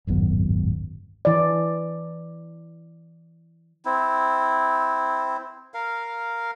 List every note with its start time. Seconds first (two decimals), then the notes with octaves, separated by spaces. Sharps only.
0.07 D1 G#1 F#2 B3
1.25 E3 D5
3.85 C4 E4
5.74 A#4 F5